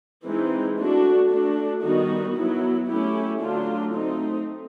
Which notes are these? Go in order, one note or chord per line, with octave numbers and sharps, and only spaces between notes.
E3 G#3 C4 D#4
A3 D4 F#4
A3 D4 F#4
D#3 G3 B3 D#4 F#4
F#3 B3 E4
A3 C#4 E4 G4
D3 F#3 A3 D4 F4
A3 C4 D#4